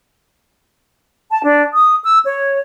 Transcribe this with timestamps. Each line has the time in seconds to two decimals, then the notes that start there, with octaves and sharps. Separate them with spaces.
1.30 A5
1.44 D4
1.74 D#6
2.04 E6
2.25 C#5